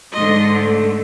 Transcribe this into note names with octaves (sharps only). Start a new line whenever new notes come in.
G#2 D3 D#5 C6
A3